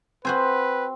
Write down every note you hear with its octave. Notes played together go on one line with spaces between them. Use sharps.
C4 F#4 B4 C5 G#5